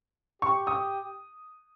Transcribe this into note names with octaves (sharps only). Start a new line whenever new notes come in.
G4 C#6
D#6